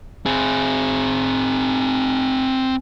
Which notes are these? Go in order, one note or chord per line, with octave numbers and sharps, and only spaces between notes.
C4 G#4